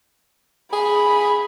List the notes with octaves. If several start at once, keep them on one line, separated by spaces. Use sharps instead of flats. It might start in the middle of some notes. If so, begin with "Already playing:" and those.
G#4 B5